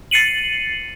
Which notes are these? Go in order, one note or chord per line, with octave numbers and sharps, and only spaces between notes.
A6 C7 C#7 D#7 F#7